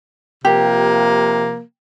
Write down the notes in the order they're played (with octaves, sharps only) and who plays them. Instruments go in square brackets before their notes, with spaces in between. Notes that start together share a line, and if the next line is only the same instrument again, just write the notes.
[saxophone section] C3 F3 A#3 [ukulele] G4